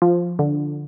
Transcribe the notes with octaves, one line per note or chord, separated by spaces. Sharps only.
F3
D3